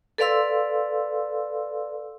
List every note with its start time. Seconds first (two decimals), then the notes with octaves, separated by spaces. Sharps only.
0.18 A4 B4 D5 F5 C6 E6